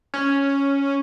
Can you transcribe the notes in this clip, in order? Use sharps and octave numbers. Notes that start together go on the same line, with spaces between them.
C#4